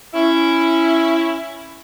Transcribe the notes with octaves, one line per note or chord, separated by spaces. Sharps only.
C#4 E4